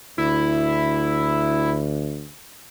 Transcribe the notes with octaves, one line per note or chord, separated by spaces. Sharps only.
D2 E4